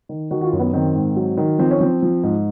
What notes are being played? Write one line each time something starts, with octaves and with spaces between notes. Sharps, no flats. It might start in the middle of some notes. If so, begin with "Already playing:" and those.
D#3
D#3 F#4
F#4
F4
F#2
B3
D#3 C4
G#2
F#3
D#3
F3 C4
C#4
F3 C4
F3
G#2